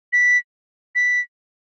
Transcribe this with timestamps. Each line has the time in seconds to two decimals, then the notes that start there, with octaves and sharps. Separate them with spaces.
0.13 B6
0.95 B6